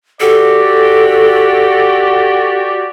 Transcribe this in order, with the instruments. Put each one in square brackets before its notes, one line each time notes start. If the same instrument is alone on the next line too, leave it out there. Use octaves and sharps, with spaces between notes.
[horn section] F#4 G4 D5 [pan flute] A4